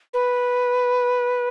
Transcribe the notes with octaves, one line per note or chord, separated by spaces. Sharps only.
B4